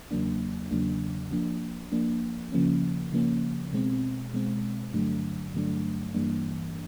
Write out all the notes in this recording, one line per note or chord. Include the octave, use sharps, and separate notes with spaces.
E2 C#3 F#3 A#3 D4
E2 C#3 F#3 A#3 D4
F3 A#3 D4
F3 A#3 D4
C#3 F3 A#3 C#4
C#3 F3 A#3 C#4
B2 G#3 C4
B2 G#3 C4
G2 D3 F#3 A3 D4
G2 D3 F#3 A3 D4
G2 E3 G3 A#3 D4